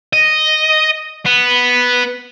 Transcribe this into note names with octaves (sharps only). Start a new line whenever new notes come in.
D#5
B3